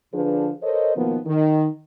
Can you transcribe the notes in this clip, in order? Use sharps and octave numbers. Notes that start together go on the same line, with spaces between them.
D3 F3 D4 G#4 B4
A4 A#4 C5 C#5 D#5
B2 D#3 F3 A#3 B3
D#3